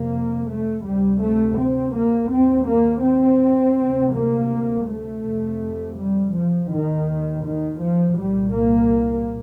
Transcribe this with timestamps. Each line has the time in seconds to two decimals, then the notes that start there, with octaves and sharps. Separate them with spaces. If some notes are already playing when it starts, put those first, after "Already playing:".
Already playing: F2 C3 A#3
0.47 A3
0.84 D2 C3 G3
1.20 A3
1.57 C4
1.93 A#3
2.30 D#2 C4
2.66 A#3
3.03 C4
3.76 D2 C3
4.13 A#3
4.87 A3
5.23 F2 C3
5.96 G3
6.33 F3
6.69 D#2 D#3
7.43 D#3
7.79 F3
8.16 C2 A#2 G3
8.52 A#3